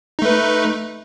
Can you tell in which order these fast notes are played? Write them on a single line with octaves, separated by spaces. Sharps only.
D#4 A3 B4